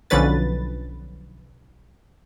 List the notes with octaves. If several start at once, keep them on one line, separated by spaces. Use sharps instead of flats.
B1 D3 F3 C#4 B4 A6